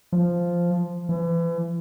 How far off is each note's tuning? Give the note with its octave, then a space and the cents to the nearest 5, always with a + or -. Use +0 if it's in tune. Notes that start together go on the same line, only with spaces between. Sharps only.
F3 -5
E3 +35